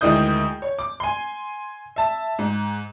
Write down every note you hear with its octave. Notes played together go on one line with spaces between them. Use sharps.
D2 D#3 G#3 E4 D#6 G6
C#5
D6
G#5 C6
E5 A5
G#2